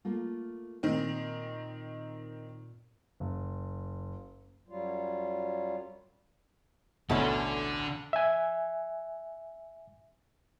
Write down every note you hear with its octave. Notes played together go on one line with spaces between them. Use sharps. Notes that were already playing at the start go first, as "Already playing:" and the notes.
A3 A#3 F4
A#2 D#3 C4
F#1
F#2 F#3 G3 F4
A1 D2 B2 D3 C#4 E4 A4
E5 G#5